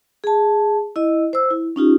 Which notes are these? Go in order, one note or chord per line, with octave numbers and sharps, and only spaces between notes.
G#4 A5
E4 D#5
C5 E6
E4
C#4 D#4 F4 G4